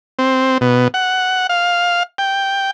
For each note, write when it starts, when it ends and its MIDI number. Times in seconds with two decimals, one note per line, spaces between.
0.19 0.58 60
0.61 0.88 47
0.94 1.47 78
1.49 2.03 77
2.18 2.71 79